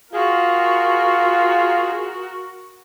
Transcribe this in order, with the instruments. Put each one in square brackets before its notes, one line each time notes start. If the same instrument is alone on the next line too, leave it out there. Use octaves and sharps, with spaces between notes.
[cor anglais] F4 [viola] F#4 A#4 [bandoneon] G#4